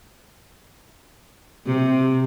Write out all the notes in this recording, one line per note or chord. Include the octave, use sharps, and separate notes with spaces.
C3